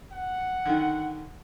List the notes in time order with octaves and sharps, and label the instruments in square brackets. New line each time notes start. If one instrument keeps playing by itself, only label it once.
[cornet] F#5
[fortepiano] D3 D#3